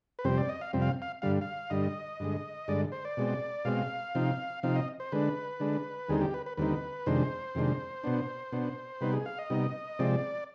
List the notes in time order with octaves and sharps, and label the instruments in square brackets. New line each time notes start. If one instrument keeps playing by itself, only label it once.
[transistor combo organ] B4
F2 C3 G3 C4 C5
D5
D#5
F5
F2 C3 G3 C4
F5
F5
G2 D3 G3 F5
F5
G2 D3 G3 D#5
G2 D3 G#3
G2 D3 G#3 D5
C5
D5
B2 G#3 C4
B2 G#3 C4 F5
C3 F3 C4 D#4
C3 F3 C4 D#4 F5
D#5
C5
D3 G#3 D4 B4
D3 G#3 D4
D#2 D3 G3 C4 D#4 G#4
G4
B4
B4
D#2 D3 G3 C4 D#4 B4
F2 C3 D#3 G#3 D4 C5
F2 C3 D#3 G#3 D4
B2 B3 D4
B2 B3 D4
C3 G3 B3 D#4 B4
G#4
F5
D#5
C3 G3 B3 D#4
C3 F3 G#3 C4 D5